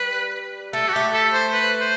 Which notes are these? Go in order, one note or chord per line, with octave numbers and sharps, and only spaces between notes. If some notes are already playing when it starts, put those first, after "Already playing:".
Already playing: G3 B4
A3 A4
F#4
A3 G4
A4
C5
B4
C5